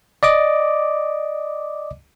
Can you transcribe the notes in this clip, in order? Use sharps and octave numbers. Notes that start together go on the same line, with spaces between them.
D5 D#5 D6